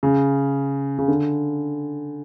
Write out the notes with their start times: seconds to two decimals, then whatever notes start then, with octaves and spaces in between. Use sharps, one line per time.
0.03 C#3
0.99 C#3
1.08 D3